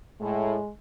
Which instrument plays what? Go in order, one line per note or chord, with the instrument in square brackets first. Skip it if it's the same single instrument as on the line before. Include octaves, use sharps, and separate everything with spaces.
[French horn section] A2 [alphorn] G#3